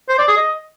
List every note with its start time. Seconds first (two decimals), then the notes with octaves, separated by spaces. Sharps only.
0.09 C5
0.18 D5
0.28 G#4
0.37 D#5